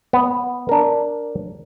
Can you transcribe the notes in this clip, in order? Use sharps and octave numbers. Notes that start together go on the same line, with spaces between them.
B3
D4 A#4